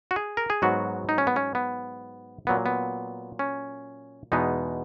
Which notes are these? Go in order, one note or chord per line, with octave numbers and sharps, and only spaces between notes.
F#4
G#4
A#4
G#4
G#2 F#3 B3 F#4
D#4
C#4
B3
C#4
B3
A#2 F#3 B3
B3
C#4
E2 B2 G#3 B3 D#4